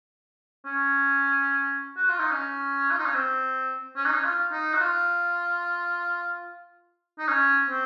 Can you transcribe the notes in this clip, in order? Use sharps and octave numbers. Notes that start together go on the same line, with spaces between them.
C#4
F#4
F4
D#4
C#4
F4
D#4
C#4
C4
C#4
D#4
C#4
F4
D#4
F#4
F4
D#4
C#4
C4